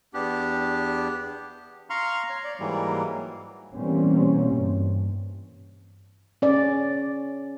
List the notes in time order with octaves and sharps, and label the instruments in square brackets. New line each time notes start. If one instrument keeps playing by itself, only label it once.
[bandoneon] E2 B3 D4 G4
F5 A#5 C6 C#6 F6
C#5
D5
G#2 E3 F#3 G3 A#3
[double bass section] B2 E3 G3 A#3 C4 C#4
G2
[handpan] C#4 D5